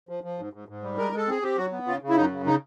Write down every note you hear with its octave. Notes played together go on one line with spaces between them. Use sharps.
F3
F3
G#2
G#2
G#2
G3
G#3 A#4
G#3 A4
C4 G#4
C4 G4
F#3 F#4
B3
C#3 F4
C#3
E4
F#2 D#4
C#3
C#3 D#4